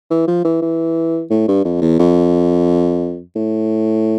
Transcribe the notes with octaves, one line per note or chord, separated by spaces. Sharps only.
E3
F3
E3
E3
A2
G2
F2
E2
F2
A2